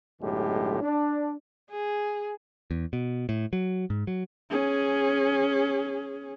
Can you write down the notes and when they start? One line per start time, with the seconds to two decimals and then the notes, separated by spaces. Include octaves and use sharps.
0.20 B1 F#2 A2 D3 G#3 G4
0.81 D4
1.71 G#4
2.71 E2
2.93 B2
3.29 A2
3.53 F#3
3.90 G#2
4.07 F#3
4.50 C#4 G#4